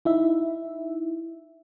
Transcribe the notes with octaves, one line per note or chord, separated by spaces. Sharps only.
D#4 E4 E5